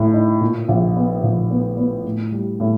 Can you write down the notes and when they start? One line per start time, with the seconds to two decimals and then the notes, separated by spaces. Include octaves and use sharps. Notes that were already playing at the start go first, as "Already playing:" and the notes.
Already playing: A2
0.13 D#4
0.41 A#2
0.68 A#1
0.96 B3
1.23 A#1
1.50 B3
1.77 B3
2.04 A2
2.32 G3
2.60 A2